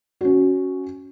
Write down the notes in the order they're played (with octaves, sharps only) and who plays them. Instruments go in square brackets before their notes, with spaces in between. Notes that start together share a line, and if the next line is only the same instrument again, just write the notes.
[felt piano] C#4 F#4